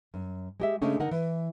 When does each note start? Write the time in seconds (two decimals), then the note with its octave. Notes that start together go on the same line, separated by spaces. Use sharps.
0.14 F#2
0.60 G#3 G4 E5
0.81 C#3 G#3 A3 C#4 D4
0.99 D3 D#4 A#4 F#5
1.11 E3